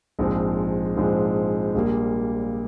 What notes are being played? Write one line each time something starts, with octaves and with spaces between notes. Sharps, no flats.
A#1 G#2 F3 G#3 C4
A#1 G#2 F3 G#3 C4
A#1 A#2 G3 A#3